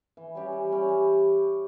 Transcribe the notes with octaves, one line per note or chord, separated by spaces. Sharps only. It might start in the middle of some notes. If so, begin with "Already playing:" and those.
E3
G3 C#4 G4
E3
G3 C#4 G4
G3